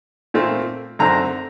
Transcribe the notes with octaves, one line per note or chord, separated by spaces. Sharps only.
A#2 A3 C4
F#2 D3 A3 C4 A#5